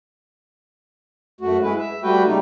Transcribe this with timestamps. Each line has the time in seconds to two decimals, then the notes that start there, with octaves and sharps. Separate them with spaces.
1.41 F#2 A3 F#4
1.62 G#3 E4 B4
1.78 E5
2.03 G3 A3 F#4 B4 G5
2.25 C#3 G3 A3 D#4